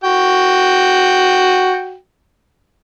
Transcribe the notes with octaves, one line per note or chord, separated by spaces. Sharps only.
F#4 G5